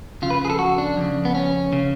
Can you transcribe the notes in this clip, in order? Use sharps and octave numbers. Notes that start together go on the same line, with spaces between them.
F2 C#3 F4
B4
G#4
A4
F#4
D4
F2 C#3
B3
C#4
C#3